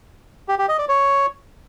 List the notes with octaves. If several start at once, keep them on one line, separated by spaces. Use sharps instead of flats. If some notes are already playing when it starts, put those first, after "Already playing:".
G4
G4
D#5
D5
C#5